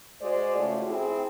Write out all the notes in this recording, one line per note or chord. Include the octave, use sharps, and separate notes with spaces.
G#3 F#4 C5 D5
A2 C#3 A3 F4 F#4
C4 E4 G#4